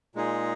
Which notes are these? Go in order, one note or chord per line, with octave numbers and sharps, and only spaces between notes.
A#2 G#3 D#4 G#4